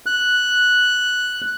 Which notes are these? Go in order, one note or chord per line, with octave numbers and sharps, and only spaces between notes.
F#6